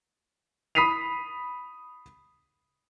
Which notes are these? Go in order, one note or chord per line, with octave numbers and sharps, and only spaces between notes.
B5 D#6 B6 C7 D#7 F7